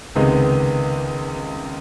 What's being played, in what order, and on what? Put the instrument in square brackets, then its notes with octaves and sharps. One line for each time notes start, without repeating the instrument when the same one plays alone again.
[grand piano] C#2 C3 D#3 G#3 B3